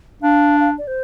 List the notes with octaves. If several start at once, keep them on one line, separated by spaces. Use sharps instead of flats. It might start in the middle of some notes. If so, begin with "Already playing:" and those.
D4 F5
F5
D5
C5